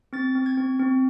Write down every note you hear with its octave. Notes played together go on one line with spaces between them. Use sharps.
C4 A6
C4
G#6
C4
C4